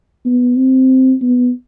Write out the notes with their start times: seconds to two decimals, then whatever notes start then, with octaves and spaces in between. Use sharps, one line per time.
0.26 B3
0.57 C4
1.22 B3